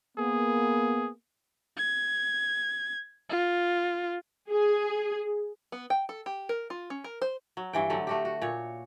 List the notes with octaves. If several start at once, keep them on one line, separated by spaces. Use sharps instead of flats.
A#3 B3 G#4
G#6
F4
G#4
B3
G5
A4
G4
A#4
F4
C#4
A#4
C5
F#3
G2 E3 G5
D3 F#3 G3 A3
A3 F#4 G4
F#4
A#2 C#5